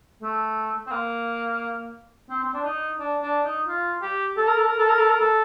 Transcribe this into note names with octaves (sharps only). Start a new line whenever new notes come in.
A3
C4
A#3
C4
C4
D4
D#4
D4
D4
D#4
F4
G4
A4
A#4
A4
A#4
A4
A#4
A4
A#4
A4